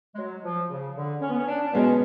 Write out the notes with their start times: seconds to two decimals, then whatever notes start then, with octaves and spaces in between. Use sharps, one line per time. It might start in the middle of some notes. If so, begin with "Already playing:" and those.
0.15 G#3
0.18 F#3
0.44 F3
0.70 C#3
0.96 D3
1.21 C#4
1.30 B3
1.38 C#4
1.47 D4
1.64 D4
1.73 B2 G#3 B3 C#4